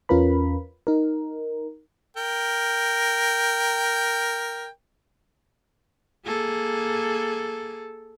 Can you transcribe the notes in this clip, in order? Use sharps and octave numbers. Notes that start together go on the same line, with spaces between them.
E2 C#4 F4 A#4 B4 B5
D#4 A#4
A#4 G5
A#3 G#4 A4